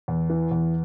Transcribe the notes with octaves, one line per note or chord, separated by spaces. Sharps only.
E2
E3
E2